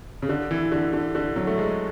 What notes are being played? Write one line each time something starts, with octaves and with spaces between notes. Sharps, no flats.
C#3
D3
E3
D3
D3
D3
F#3
A3
G#3